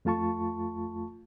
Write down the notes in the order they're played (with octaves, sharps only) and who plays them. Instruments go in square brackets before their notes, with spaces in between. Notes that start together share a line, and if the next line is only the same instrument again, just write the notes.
[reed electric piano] F2 A3 F4 A5 C#6